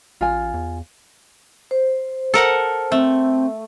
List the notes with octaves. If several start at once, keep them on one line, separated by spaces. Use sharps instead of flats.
A1 F4 G#5
E2
C5
A4 A#4 F#5
A3 C4